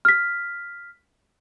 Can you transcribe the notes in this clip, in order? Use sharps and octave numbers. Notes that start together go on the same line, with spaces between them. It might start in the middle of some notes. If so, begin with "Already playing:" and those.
F6 B6